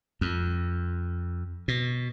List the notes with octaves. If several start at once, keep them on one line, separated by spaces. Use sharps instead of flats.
F2
B2